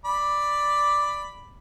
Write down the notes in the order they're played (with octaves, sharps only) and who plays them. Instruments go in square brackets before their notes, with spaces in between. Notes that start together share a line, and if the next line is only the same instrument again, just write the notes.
[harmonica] D5 B5